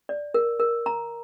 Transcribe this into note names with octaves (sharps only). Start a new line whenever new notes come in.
D5
A#4
A#4
A#5